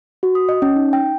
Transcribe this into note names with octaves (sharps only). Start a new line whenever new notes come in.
F#4
D#6
D#5
C#4
D#4
G5